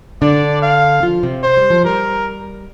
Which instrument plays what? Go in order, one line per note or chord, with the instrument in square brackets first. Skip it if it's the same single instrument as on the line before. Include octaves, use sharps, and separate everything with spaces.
[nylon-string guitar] D3 D4 [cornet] D5
[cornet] F5
[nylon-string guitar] F3 F4
C3 C4
[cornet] C5
[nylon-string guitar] G3
F3
[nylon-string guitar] G3 [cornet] A#4